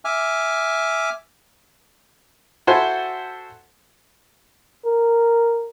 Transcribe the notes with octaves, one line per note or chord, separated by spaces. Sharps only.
E5 G#5 D6 F6
E4 F#4 A4 C5 G#5 C6
A#4